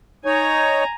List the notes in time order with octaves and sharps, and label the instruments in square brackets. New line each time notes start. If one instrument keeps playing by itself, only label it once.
[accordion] D#4 C#5 [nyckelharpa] G#5 A#5